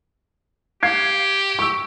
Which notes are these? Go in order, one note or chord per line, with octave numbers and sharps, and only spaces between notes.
G4 F5 G#6 C7
C#6 E6